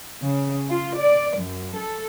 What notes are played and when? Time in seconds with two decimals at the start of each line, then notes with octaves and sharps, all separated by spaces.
0.22 C#3
0.70 F4
0.98 D5
1.39 F#2
1.77 A4